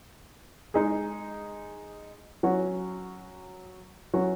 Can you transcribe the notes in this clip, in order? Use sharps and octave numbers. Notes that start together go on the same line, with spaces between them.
G#3 D#4 G#4
F#3 C#4 F#4
F#3 C#4 F#4